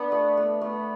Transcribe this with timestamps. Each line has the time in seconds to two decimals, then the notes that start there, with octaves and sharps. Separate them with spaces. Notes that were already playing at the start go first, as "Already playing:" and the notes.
Already playing: B3 D4
0.12 A3
0.37 A3
0.61 A3 B3